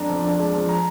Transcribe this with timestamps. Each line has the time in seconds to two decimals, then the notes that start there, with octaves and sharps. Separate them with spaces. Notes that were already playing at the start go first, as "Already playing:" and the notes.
Already playing: F2 D4 A#5
0.09 F3
0.24 D4
0.39 G#3
0.54 F3
0.69 A#5